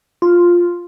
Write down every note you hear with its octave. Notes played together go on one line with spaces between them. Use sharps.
F4